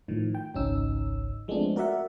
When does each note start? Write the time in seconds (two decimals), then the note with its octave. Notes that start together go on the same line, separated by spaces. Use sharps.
0.08 A2 D#3 F3
0.35 G5
0.55 G#1 C#2 C#4 D#4 E6
1.48 F3 G#3 A3 B3 C4 D4
1.76 F#4 A#4 D5 E5 F#5